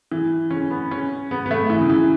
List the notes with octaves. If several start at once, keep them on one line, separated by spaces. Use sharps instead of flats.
E3
C#4
B3
C#4
B3
B3
A3
E3
C#3
E3